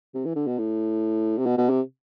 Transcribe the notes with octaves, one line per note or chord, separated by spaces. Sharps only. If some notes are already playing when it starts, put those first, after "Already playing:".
C3
E3
D3
B2
A2
C3
B2
B2
C3